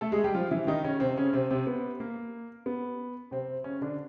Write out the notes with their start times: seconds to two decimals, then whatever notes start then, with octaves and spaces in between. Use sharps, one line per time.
0.01 A3 A4
0.12 G#3 G#4
0.24 G3 G4
0.34 F3 F4
0.51 E3 E4
0.67 D#3 D#4
0.84 C#3 C#4
1.00 C3 C4
1.17 C#3 C#4
1.33 C3 C4
1.51 C3 C4
1.67 B3
2.00 A#3
2.66 B3
3.31 C3 C4
3.64 C#3 C#4
3.81 D3 D4